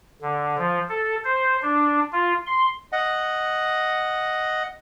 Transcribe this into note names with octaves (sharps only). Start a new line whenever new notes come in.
D3
F3
A4
C5
D4
F4
C6
D#5 F#5